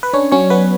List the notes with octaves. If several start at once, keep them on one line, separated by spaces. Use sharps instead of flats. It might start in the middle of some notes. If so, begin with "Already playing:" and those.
B4
C#4 D4 C#5
F#3 C#4 C#5
B3 B4